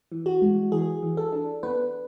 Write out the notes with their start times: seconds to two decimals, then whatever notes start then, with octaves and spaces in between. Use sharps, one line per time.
0.12 E3
0.26 F#4
0.42 G#3
0.72 E3 G#4
1.03 E3
1.17 A4
1.32 D4
1.63 B3 B4